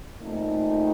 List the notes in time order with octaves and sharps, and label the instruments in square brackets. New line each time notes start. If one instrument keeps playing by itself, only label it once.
[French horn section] A#2 A3 C4 D#4